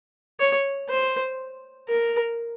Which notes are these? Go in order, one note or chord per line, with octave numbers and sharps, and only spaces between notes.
C#5
C5
A#4